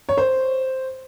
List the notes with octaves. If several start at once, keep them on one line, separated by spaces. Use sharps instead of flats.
C#5
C5